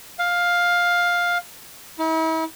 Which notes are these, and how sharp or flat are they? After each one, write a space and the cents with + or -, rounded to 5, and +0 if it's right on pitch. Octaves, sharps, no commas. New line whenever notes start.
F5 +10
E4 -40